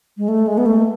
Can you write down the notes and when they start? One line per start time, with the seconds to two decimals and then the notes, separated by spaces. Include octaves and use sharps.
0.18 G#3
0.28 A3
0.47 G#3
0.58 B3
0.66 A3